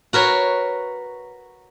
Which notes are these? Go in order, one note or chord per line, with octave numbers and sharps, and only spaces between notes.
F#4 A#4 B4 C#5